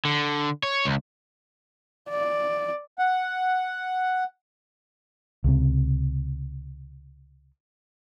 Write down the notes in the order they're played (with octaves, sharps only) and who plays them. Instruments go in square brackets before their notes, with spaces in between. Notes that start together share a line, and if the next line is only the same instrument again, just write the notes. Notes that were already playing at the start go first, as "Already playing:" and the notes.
[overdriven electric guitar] D3
C#5
C#2
[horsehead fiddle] D5
[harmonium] F#5
[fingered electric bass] C#2 C3